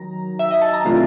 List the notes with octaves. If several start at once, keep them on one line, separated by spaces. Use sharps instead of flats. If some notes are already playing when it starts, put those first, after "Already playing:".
Already playing: D#3 F#3 A#5
E5
D#5
A5
A#5
C3 E3 A3 D4 F4 A5